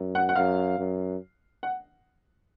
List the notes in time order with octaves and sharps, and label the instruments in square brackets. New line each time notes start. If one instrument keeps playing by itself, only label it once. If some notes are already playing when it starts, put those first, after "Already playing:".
Already playing: [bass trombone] F#2
[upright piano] F#5
F#5
[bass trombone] F#2 [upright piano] F5
[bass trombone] F#2
[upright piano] F#5